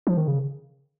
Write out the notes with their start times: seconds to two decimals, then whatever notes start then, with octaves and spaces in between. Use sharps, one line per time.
0.07 F3
0.17 D#3
0.28 C#3